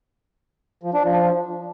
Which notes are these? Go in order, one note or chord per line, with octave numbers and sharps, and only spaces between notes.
F3
D4
F3